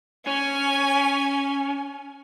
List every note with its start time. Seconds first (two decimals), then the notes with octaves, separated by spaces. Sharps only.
0.27 C#4 G#5